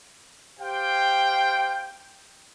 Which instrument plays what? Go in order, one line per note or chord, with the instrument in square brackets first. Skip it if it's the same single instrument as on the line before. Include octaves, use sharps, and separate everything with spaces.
[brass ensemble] G4 C5 F5 G5